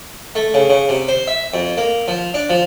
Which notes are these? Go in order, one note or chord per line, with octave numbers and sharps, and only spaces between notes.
A3
C#3
C#3
C3
C5
E5
F2
A#3
F3
D4
F3